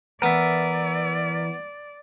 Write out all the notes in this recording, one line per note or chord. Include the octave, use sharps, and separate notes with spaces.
E3 B3 A#4 D5 E5